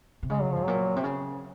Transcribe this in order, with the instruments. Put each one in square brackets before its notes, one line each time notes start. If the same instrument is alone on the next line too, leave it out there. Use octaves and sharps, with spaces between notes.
[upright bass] C3
[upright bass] C#3 [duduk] G#3
[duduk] F#3
[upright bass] G#2 [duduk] F3
[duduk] F#3
[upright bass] A#2
C3
C#3